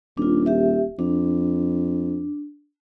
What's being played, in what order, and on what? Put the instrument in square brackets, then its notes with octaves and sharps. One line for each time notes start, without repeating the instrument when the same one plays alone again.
[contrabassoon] D#1 [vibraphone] D4 F4
[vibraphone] G4 E5
[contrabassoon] F2 [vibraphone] D4